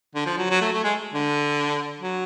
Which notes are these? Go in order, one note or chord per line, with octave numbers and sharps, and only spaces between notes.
D3
F3
F#3
F#3
A3
A3
G#3
D3
F#3